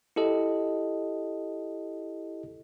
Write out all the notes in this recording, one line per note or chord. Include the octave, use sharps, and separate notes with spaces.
E4 G4 A4 D#5